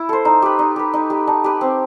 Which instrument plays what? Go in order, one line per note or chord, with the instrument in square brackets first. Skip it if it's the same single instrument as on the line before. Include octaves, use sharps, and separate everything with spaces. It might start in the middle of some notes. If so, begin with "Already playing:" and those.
Already playing: [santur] E4 [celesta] B5
[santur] A4 C5
[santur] D#4 [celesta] A#5
[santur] G4 B4
D#4
G4 B4
D#4
G4 B4
[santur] D#4 [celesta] A5
[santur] G4 B4
C4